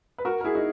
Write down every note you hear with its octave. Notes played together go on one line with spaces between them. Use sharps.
B4
F#4 A#4
A#4
E4 G#4
D#4 F#4